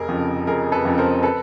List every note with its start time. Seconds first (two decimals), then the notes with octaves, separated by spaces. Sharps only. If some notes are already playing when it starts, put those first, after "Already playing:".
Already playing: F1 G#4 A#4
0.09 F2 C#3 F3
0.47 F1 G#4 A#4
0.72 A4 B4
0.85 F2 C#3 F3
0.98 A#4 C5
1.23 A4 B4